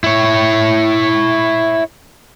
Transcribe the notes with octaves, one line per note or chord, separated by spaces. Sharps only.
E4 C#5